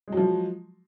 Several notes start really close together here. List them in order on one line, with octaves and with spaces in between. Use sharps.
G#3 F#3 F3